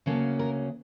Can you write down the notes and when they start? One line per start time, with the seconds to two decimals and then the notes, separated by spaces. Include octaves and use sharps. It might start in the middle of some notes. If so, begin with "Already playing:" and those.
0.06 D2 C#3 F#3 A#3 C#4 A4
0.39 A#4